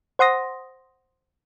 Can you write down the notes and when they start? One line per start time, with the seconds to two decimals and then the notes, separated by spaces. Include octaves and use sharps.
0.19 C5 F#5 C6 D#6 A#6